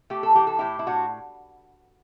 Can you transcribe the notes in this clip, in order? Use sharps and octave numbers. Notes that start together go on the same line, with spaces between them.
A3 G4
A4
E3 G4
A4
A2 E4 G4
E4
A2 D4 F#4